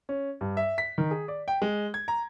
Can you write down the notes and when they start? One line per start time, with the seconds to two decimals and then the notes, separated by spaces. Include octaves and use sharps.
0.09 C#4
0.41 G2
0.57 E5
0.78 B6
0.98 D#3
1.11 G#4
1.28 D5
1.48 G5
1.62 G#3
1.94 G#6
2.08 A#5